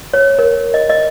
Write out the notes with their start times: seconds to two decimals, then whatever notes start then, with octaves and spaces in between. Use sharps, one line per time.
0.14 C#5
0.39 A#4
0.74 D#5
0.90 D#5